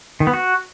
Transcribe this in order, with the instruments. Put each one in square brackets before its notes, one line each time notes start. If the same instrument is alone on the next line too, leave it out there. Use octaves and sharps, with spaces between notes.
[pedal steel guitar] D#3
B3
F#4